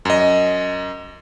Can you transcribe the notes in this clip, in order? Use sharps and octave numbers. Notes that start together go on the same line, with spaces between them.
F#2 D#5